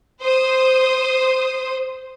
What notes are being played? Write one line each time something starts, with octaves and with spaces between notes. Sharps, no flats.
C5 D#6